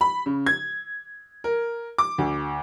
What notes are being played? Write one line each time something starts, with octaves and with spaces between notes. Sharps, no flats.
B5
C#3
G#6
A#4
D6
D2